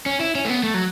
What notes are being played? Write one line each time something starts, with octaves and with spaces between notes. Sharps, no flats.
C#4
E4
C#4
A3
B3
A3
F#3